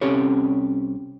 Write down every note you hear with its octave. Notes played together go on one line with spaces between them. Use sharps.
C2 C4 C#4 G4 A4 C#5